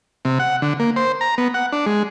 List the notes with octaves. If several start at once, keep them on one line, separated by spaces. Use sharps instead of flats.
C3
F#5
D3
A#3
C5
A#5
B3
F#5
D4
G#3